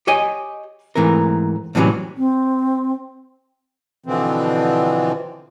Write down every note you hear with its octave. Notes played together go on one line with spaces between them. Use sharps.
G4 C#5 D#5 G5 G#5
G#2 E3 A3 C4 A#4
A2 C3 E3 F#3 G3 C#4
C4
B2 D3 E3 F3 C4